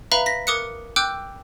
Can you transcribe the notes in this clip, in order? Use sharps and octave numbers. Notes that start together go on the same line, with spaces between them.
B4 E5 F5 A#5 B5
A#6 B6
A#4 D6 D#6 F#6 C#7
G5 D6 E6 F#6 G6